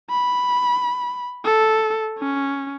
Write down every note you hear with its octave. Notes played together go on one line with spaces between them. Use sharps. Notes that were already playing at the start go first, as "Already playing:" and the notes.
B5
A4
C#4